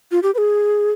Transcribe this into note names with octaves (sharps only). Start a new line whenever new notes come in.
F4
G4
B4
G#4